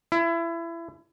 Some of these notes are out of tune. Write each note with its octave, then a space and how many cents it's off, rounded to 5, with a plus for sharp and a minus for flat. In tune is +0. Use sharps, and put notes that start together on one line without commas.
E4 +25